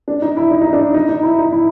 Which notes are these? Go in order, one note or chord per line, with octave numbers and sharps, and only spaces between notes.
D4
D#4
E4
D#4
D#4
D4
D#4
D#4
E4
D#4
E4